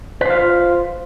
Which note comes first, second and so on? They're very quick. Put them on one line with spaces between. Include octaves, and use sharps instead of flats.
B4 C5 F5 F4